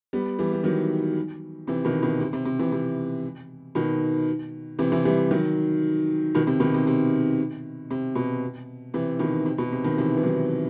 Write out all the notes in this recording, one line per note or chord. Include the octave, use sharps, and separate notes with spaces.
G3 B3
E3 G3
G3
D#3 F#3
C3 E3
B2 D#3
B2 D#3
C3
C3
C3
C3 E3
C3
B2 D#3
C3 E3
C3 E3
E3 G3
D#3 F#3
B2 D#3
C3
B2 D#3
C3
C3
C3
B2
C3 E3
B2 D#3
C3
B2
C3
B2 D#3
C3 E3
E3
D#3 F#3